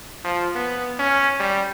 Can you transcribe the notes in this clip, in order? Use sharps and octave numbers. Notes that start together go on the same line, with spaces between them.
F3
B3
C#4
G3